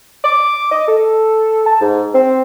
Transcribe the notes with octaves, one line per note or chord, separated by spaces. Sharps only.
D6
D#5
A4
A5
G#2
C4